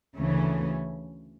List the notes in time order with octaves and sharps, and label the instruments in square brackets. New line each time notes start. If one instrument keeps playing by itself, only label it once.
[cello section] D2 C#3 E3 A3 C#4